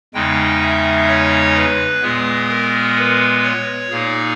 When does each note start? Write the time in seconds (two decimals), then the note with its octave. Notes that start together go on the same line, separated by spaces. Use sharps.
0.14 E2 C#3 G#3 D#4 G5
0.61 E5
1.08 C#5
1.55 B4
2.02 A#2 G#3 B3 G#4
2.49 A#4
2.97 B4
3.43 C#5
3.90 A#2 A#3 D#4 G#4